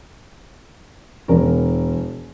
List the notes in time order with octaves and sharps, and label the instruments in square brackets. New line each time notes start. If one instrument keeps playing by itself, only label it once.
[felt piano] E1 A#4